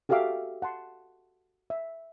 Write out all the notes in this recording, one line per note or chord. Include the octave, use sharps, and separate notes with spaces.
F#4 G4 A4 E5 F5 D6
F#5 A5 C6
E5